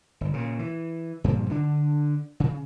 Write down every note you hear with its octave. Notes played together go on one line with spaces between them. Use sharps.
G1
A#2 C#3
E3
G2 A#2 F3
D3 D4
C#3